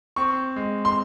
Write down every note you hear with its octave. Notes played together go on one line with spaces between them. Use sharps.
C4 C#6
G#3
C6